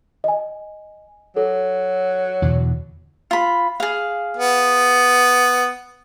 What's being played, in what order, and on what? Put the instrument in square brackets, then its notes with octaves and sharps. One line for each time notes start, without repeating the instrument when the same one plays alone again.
[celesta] D#5 G#5
[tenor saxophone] F#3 [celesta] A4
[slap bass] E2 B2 D3
[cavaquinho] F4 B5
G#4 F5
[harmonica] B3